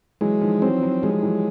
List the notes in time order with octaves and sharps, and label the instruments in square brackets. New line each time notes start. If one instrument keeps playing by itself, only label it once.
[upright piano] E3 F#3 [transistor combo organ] G#3
[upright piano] D#3 F3
[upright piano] E3 F#3 [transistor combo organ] C4
[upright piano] E3 F#3
[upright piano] F3 G3 [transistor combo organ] G#3
[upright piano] E3 F#3